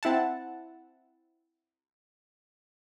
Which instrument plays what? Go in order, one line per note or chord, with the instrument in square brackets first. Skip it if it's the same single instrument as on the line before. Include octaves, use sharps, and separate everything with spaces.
[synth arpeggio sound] C4 E4 F#5 A5